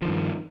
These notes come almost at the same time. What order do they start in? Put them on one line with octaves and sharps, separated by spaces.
F3 D#3 G2